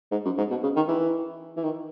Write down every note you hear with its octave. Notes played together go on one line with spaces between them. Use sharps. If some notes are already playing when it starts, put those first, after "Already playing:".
G#2
F#2
G#2
B2
C#3
D#3
E3
E3
D#3